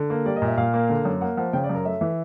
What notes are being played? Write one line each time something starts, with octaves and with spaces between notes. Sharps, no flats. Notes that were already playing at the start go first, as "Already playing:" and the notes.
Already playing: D3
A#3
G3 D5
D#5
A#2
E5
A#2 F5
A#3
D3
F#2
A#3 F#5
F3 F#5
C#3 G5
D5
F#2
A#4
A3 E5
E3